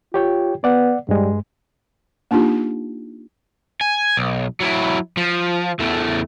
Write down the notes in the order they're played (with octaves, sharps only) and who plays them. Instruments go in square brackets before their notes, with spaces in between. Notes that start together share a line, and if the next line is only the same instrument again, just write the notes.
[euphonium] F4 [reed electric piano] G4 C#5 G5
[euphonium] B3 [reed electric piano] D5 F#5
[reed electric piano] G2 G#3 [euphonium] G3
[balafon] A#3 D4 D#4 F4 G4
[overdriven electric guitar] G#5
B1
F#3 E4
F3
E2 A3